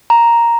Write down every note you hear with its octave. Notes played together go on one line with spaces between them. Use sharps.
A#5